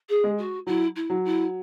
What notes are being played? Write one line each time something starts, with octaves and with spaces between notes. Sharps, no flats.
G#4
G#3
F#4
F#3 E4
E4
F#3
E4